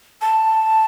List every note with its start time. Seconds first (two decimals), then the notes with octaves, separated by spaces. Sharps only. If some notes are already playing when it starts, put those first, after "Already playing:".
0.22 A5